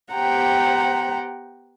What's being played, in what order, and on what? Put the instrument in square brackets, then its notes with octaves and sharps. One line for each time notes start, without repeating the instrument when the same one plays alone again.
[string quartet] B3 G4 C5 F#5 G5 A#5